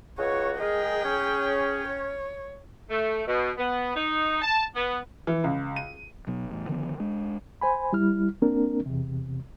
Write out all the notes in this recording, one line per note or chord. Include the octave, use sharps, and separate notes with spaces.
C#2 F#4 C#5
G#3 G#4 A#4 G5
C#4
C#5
A3
B2
B3
D#4
A5
B3
E3
C#2
D#7
B1 B2 F#3 B3
E2 A2
D3 D#3 F3 B3
G#3 D4
C5 G#5 B5
G3 E4 F6
A#3 C4 D4 A#4
E2 C3